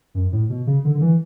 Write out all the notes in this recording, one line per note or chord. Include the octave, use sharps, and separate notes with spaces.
F#2
A2
B2
C#3
D3
D3
E3